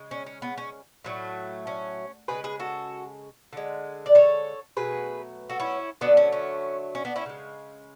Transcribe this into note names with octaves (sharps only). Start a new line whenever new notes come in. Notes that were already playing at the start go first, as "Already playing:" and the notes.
Already playing: C#3 G#3
C#4
C#4
B3
C#4
A2 F#3 A3
C#4
C#3 G#3 G#4 B4
G#4 B4
F#4 A4
D3 G#3
D5
A4 C#5
B2 F#3 A3 G#4 B4
F#4 A4
C#4 E4
D3 F#3 A3 B3 D4
C#4
C#4
C#4
B3 D4
C#4 E4
C#3 G#3